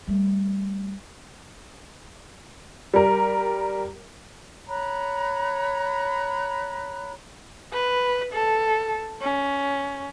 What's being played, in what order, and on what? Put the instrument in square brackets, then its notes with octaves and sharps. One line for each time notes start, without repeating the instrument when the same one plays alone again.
[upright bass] G3 A3
[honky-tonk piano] G3 A#4
[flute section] C#5 A#5 B5 F#6
[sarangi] B4
A4
C#4